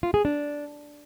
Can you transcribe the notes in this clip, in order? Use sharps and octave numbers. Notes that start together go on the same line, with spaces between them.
F4
G#4
D4